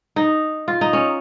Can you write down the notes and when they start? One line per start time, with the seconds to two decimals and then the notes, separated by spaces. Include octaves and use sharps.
0.16 D#4
0.68 F4
0.81 D#4
0.93 C#4